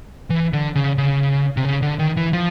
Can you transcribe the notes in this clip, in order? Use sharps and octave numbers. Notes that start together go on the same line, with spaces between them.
E3
D3
C#3
C#3
C3
C#3
D3
D#3
E3
F3